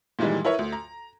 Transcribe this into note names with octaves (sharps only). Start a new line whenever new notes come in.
A#2 D#3 E3 G3 G#3
E4 A#4 B4 C#5 E5
D2
A#5